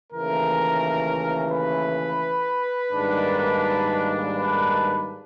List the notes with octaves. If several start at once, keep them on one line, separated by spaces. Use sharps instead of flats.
D#2 C#3 E3 A3 A#4
B4
G#2 D#3 G3 A#3 D4
B4